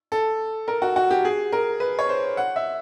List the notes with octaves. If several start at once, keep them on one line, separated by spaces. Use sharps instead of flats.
A4
A#4
F#4
F#4
G4
G#4
A#4
B4
C#5
C5
F#5
E5